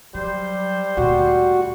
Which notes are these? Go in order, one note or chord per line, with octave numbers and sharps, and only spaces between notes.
F#3 G3 C5
D2 A#2 F#4